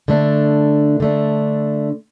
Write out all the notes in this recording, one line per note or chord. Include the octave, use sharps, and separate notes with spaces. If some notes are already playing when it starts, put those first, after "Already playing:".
D3 A3 D4
D3 A3 D4